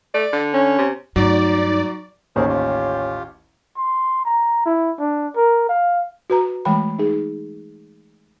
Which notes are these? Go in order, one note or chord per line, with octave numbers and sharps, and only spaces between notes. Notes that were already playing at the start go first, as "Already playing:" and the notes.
A3 D5
D3
C#4
C3
G2 F#3 A3 D#4 D5
A1 D#2 C#4 G4 G#4 A#4 C5
F4 G4
C6
A#5
E4
D4
A#4
F5
F#4 B4 A#5
E3 G#3 A3 G5 B5
D#4 G#4